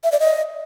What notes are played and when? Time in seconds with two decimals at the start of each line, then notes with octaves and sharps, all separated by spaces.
0.04 E5
0.12 D5
0.20 D#5